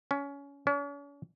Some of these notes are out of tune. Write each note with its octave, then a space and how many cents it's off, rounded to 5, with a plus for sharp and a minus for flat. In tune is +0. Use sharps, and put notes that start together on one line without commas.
C#4 +25
C#4 +45